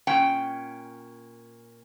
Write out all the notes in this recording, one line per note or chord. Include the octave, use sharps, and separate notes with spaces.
A#2 C#4 G5